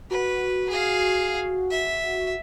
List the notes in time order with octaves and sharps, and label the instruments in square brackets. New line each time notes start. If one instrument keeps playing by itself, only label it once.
[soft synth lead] F#4 [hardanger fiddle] B4
[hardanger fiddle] G#4 F5
E5